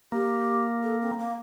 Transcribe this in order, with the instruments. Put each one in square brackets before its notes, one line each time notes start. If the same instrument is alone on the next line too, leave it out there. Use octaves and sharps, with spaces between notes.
[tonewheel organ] A#3 [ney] G4
[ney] A4
C4
A#3